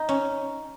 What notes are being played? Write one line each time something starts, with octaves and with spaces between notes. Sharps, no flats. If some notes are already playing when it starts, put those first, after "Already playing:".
Already playing: D#4
C#4